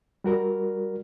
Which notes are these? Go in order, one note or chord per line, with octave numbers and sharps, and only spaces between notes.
G3 F#4 A#4